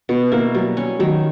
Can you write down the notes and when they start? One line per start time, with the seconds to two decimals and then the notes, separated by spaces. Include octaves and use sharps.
0.09 B2 B3
0.32 A#3 E4
0.54 F#3 G3
0.77 C#4
0.99 D#3 F#3